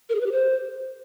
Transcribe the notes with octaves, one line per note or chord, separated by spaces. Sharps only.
A#4
G#4
B4
G4
C5